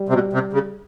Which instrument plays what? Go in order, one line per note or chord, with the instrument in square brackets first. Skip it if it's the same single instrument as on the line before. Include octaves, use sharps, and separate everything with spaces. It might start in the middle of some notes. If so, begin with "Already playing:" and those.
Already playing: [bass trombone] G3
[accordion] C3
B2
C3
C#3